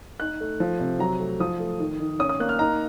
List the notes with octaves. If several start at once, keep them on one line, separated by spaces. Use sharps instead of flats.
D#4 F#6
A3
F3
C3
F#3 A#5
A3
F3 D#6
A3
D#3
D#3
C#4 D#6
D#6
A#3 F#6
F6
D#4 A#5